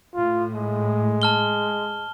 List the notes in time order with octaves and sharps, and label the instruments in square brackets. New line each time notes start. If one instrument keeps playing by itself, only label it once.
[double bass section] A2 [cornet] F4
[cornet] G#3
[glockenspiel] A5 F6 G7